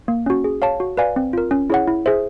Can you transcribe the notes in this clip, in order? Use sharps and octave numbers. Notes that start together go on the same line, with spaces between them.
A#3
C#4 F#4
G#4
C#5 F5 A5
F#4
B4 D5 F5 G#5
C4
F4 A#4
C#4
E4 G#4 C#5 F#5
E4
G#4 C5 E5